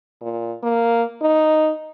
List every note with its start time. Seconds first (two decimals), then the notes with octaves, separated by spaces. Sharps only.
0.21 A#2
0.63 A#3
1.22 D#4